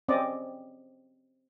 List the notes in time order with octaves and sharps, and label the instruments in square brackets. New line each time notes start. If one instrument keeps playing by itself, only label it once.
[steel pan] C4 C#4 D5 D#5